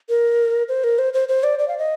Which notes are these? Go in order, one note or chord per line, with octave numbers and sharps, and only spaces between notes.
A#4
C5
A#4
C5
C5
C5
D5
D5
F5
D#5